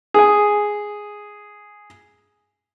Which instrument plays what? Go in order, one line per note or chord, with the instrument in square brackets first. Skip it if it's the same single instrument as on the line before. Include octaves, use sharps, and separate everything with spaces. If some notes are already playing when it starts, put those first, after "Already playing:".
[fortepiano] G#4 G#5